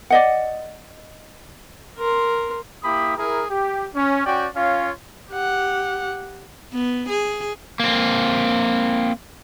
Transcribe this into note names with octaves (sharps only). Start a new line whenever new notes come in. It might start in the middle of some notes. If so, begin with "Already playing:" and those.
D5 D#5 F#5
A#4 C6
A#3 E4 G4 B5 D#6
E4 G#4 A#4
G4
C#4
C#4 F#4 D5 G5
C#4 F4 C#5 F5
G4 F#5
B3
G#4
A#3 C4